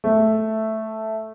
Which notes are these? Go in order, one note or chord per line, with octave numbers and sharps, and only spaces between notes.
A3